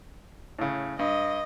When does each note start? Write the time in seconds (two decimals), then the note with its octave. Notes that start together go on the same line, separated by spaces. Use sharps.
0.59 A2 C#3
0.99 G2 D#5